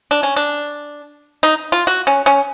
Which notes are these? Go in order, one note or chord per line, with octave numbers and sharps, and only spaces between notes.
D4
C#4
D4
D#4
F4
F#4
C#4
C#4